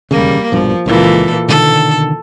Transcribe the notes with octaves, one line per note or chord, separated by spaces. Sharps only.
E1 D#2 C#3 G3 A#3
A#1 G2 B2 F3
C#2 A#2 C#3 E3 A4
B2 D3 D#3 A4